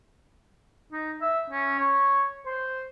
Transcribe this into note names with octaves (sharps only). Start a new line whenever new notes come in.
D#4
E5
C#4
C#5
C5